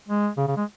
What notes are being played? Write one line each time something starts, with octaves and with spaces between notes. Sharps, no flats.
G#3
C#3
C#3
G#3